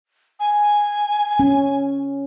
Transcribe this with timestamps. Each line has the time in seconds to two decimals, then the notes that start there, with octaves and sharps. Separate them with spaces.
0.40 G#5
1.40 C#4